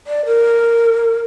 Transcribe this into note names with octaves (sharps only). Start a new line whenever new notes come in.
D5
A#4